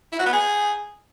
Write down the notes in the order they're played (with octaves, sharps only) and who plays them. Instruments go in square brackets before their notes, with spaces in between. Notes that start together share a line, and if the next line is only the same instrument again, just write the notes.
[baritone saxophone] E4
F#4
B3
G#4